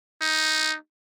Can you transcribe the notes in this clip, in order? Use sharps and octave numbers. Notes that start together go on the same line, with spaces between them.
D#4